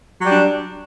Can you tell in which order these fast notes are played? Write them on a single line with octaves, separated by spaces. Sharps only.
F#3 G3 D4